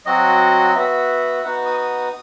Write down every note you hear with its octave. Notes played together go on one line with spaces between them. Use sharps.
F#3 C4 F#4 D#5
B3 F#4 E5
B3 D#4 F#4 F#5
D#6
D#6